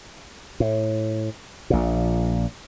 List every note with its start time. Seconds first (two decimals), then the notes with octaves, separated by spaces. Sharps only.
0.60 A2
1.70 A#1 A#2